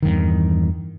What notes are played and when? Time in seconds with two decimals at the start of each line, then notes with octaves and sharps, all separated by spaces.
0.03 E2 G2 D#3